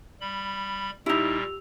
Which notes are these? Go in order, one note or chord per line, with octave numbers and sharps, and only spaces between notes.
G3 B5
A#2 G3 D#4 E4 G4 E6 F7